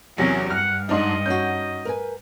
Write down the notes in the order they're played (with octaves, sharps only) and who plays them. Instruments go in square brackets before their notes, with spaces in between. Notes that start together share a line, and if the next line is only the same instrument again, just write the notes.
[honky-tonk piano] E2 C3 F#3 [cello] C#4 A#4 [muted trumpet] G#4
[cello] G2 [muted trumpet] F#5 [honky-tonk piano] F6
[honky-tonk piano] G#2 D4 D#4 [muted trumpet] D#5
[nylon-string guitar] C#4 D#4 F#4 [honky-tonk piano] G6
[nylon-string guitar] A#4 B4 G#5